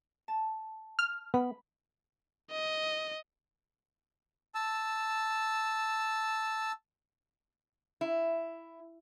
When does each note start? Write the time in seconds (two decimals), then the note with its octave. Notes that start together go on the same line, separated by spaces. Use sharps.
0.28 A5
0.99 F6
1.34 B3 B5
2.51 D#5
4.55 A5 E6
8.01 E4